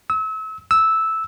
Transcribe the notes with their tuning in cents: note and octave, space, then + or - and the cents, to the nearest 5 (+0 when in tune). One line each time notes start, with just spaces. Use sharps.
E6 -35
E6 -10